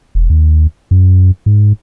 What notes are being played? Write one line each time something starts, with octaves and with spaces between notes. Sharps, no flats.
E1
D#2
F#2
G#2